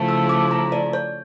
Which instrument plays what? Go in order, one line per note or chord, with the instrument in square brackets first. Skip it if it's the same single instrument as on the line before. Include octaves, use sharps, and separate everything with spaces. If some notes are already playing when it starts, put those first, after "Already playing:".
Already playing: [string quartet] C#3 F3 A3 E4
[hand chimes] E6
D6
A#5
D5
C#5